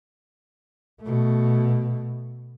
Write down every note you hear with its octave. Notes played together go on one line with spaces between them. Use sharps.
B2 A3